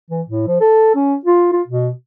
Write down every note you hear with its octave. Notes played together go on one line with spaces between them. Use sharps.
E3
A2
F3
A4
C#4
F4
F4
B2